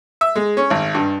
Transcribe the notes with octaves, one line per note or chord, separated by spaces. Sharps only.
E5
G#3
C#4
G#1
G2